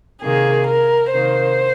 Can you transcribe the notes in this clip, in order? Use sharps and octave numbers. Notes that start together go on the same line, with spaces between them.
C3 D#3 A#3 G#4
A#4
C3 D#3 A#3 C5